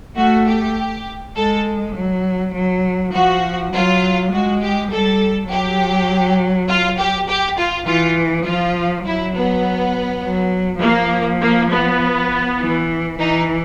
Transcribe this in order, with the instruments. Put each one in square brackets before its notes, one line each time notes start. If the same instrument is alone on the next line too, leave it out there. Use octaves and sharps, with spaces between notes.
[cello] A3 [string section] F#4
[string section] G4
[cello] G#3 [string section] A4
[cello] F#3
F#3
[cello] F3 [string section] F#4
[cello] F#3 [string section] F4
[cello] G#3 [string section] F#4
[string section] G4
[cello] G3 [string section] A4
[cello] F#3 [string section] G4
[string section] F4
G4
G4
F4
[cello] E3 [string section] F4
[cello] F3 [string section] F4
[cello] F#3 [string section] E4
[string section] B3
[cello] F#3
[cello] F3 [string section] A#3
[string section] A#3
B3
[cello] E3
[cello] E3 [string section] D#4